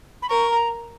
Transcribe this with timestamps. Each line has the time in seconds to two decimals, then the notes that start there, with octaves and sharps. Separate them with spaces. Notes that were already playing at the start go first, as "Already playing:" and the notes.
0.22 B5
0.29 A#4 C#6
0.50 A#5